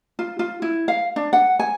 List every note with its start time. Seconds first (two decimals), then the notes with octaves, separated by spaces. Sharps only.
0.19 F4
0.39 F4
0.62 E4
0.88 F5
1.16 D4
1.33 F#5
1.59 G#5